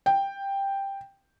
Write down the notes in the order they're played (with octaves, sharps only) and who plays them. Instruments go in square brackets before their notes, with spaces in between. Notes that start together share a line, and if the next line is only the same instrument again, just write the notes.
[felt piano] G5